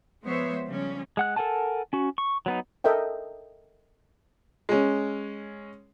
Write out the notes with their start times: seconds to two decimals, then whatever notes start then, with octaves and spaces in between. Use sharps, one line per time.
0.23 F3 G#3 B3 C5 C#5 E5
0.66 C#3 F3 G3 C#4
1.17 G#3 F#5 F#6
1.36 A4 A#4 F#5 G#5 A5
1.93 C#4 F#4
2.18 C#6
2.46 F#3 B3 D#4
2.84 A4 A#4 D#5 E5 G5
4.69 G#3 C#4